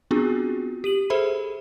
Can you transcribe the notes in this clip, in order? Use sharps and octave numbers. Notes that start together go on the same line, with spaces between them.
B3 C4 D4 F4 F#4 G#4
G4 D#7 F#7
G#4 A4 C5 E5 B5